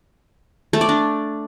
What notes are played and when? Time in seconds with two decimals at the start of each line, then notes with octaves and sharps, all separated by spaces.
0.73 A3
0.81 D5
0.89 D4